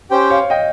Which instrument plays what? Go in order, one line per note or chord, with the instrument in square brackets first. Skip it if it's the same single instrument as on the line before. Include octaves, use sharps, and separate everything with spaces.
[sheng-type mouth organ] C#4 G4 C5 G5
[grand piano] C#5 F5
D#5 G5